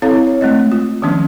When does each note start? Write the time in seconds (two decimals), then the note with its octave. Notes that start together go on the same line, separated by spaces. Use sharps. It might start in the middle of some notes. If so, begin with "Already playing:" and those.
0.02 C4 E4 A4 C#5 F5 A#5
0.27 C#5
0.41 G#3 A3 C4 D#5
0.72 F4
1.02 D#3 F3 F#3 B3 C#4 D4